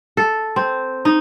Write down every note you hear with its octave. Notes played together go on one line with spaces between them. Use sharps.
A4
C4
D#4